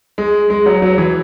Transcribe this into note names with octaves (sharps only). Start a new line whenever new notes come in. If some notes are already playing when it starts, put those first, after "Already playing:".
G#3
G#3
F#3
F#3
E3